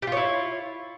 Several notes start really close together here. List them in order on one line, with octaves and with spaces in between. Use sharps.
G4 F4 C#5 E4